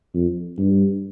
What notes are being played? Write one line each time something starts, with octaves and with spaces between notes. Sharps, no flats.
F2
G2